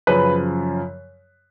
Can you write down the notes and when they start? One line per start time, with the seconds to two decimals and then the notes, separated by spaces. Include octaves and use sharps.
0.07 F#2 C#3 F3 B4 B5